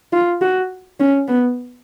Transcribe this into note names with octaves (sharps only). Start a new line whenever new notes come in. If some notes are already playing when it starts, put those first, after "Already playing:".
F4
F#4
C#4
B3